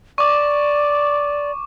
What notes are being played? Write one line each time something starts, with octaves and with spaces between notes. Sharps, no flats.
D5 C#6 D6